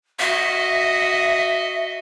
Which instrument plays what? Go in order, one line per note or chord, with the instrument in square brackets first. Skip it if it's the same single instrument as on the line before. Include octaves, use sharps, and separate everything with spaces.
[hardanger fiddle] F#4 D#5 [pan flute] E5